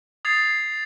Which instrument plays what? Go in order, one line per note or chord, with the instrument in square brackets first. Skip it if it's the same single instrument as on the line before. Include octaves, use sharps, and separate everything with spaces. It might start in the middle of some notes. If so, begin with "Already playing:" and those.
[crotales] D#6 G#6 A6 C7 F7